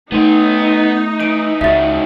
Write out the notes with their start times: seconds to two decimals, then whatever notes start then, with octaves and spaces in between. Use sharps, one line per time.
0.12 A3 B3 D#4 C6
1.20 E3 D7
1.61 C#2 G#3 F#4 E5 A6